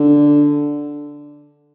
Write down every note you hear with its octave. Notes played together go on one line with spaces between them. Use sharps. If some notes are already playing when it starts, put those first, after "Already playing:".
Already playing: D3